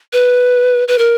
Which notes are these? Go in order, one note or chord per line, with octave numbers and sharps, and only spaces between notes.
B4
B4
A#4